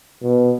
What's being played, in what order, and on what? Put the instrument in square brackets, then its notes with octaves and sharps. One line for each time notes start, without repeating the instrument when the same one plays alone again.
[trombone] B2